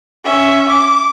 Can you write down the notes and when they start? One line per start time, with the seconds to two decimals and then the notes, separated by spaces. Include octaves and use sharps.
0.25 C#4 E5
0.69 D6